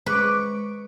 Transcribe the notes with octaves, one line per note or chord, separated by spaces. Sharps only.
G#3 B4 C5 C#6 D6 D7